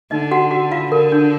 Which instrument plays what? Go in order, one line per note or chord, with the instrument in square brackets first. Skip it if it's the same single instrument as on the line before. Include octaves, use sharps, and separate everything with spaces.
[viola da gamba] D3 [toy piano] D#4 D#5
[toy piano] F#4 F#5
F#4 F#5
F4 F5
[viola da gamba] D3 [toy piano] A#4
[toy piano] D4